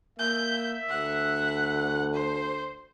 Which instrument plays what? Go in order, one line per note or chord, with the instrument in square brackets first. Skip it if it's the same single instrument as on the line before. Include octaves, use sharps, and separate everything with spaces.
[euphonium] A#3 [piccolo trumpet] E5 [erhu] G6
[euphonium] D2 [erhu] F#5
[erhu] C5